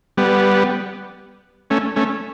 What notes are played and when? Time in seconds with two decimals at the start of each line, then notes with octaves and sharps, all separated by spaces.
0.17 G3 B3
1.70 A3 C#4
1.96 A3 C#4